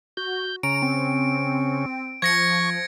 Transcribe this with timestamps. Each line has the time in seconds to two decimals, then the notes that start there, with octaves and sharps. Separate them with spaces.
0.17 F#4 G6
0.63 C#3 C#4 A#5 D7
0.82 C4
2.22 F3 C#6 G#6 A#6 C#7